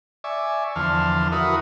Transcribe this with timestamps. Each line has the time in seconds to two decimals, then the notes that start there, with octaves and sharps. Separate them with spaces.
0.24 D5 E5 G#5 C#6
0.76 E2 D3 F3 A5 C6 F6
1.32 E4 F#4 A#4 B4 D#6